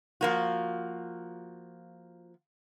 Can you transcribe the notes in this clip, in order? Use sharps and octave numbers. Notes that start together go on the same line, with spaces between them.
F3 A#3 F#4